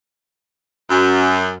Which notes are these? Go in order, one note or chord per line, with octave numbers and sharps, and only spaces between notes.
F#2